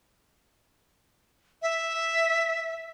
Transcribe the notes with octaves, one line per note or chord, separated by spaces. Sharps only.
E5